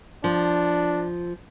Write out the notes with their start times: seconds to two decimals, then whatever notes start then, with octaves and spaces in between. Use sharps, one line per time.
0.24 F3 D4